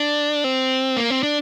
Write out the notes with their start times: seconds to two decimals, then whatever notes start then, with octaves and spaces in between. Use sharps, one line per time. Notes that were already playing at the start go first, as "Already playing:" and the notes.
Already playing: D4
0.44 C4
0.97 A#3
1.10 C4
1.23 D4